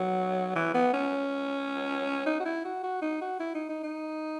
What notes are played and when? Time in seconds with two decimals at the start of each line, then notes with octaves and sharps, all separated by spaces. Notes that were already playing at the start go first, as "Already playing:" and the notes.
Already playing: F#3
0.55 E3
0.74 B3
0.93 C#4
2.26 D#4
2.40 F#4
2.45 E4
2.65 F#4
2.83 F#4
3.02 D#4
3.21 F#4
3.40 E4
3.55 D#4
3.69 D#4
3.83 D#4